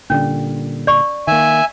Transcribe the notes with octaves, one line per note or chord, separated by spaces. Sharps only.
A#2 D3 G3 C#4
D5 C#6
D#3 A#3 E5 G#5